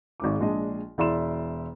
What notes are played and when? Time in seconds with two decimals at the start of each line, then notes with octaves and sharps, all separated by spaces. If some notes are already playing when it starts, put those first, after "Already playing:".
0.20 G#1 G#2 D6
0.40 A#1 G#3 D4 D#5
0.98 E1 E4 D5 C6 E7